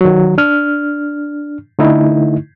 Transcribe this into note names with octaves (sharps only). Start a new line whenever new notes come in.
D#3 F#3
D4 F6
D3 A3 D#4 E4